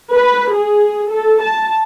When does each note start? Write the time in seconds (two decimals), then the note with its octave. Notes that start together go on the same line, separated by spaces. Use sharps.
0.13 B4
0.55 G#4
1.12 A4
1.43 A5